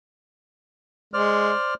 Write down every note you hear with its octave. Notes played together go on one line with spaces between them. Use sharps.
G#3 C5 D5 F6